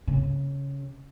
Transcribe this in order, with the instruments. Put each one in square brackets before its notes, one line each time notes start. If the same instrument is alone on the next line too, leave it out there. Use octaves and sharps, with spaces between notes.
[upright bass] C#3